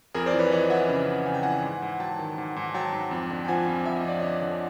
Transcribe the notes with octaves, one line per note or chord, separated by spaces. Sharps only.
F2 G#4 A#4
C5 D5
E3
B4 C#5
E3 C#5 D#5
E3 E5 F#5
C#3
C#3
C#3 G#5
G5
E3 F#5 G#5
G#2
G#2
F#3 G5 A5
D#3
G#2
G#2
F#3 G5 A5
G#2
F2
D3
G5
F3 F#5 G#5
F2
F2 E5
D#5
F2 D5
D3 C#5 D#5
D3